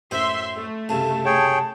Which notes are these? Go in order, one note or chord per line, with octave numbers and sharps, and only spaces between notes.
F#2 A2 C5 E5 C6
A3
C2 F#2 C#3 A5
G#4 C#5 G5